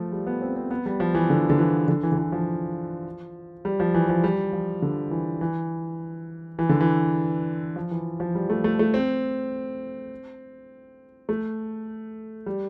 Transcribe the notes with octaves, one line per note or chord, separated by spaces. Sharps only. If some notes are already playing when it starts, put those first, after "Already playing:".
Already playing: F3 A3
G3
B3
C4
C4
B3
G3
F3
E3
D3
D3
E3
D3
E3
D3
E3
F3
G3
F3
E3
F3
G3
F3
D3
E3
E3
E3
D3
E3
F3
E3
F3
G3
A3
A3
A3
C4
A3
G3